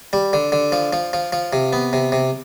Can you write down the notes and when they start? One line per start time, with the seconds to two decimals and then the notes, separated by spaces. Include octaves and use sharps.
0.13 G3
0.33 D3
0.52 D3
0.72 F3
0.93 F3
1.13 F3
1.33 F3
1.53 C3
1.73 B3
1.93 C3
2.12 C3